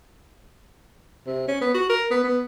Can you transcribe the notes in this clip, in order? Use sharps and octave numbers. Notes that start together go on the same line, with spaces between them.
C3
C#4
B3
F#4
A#4
B3
B3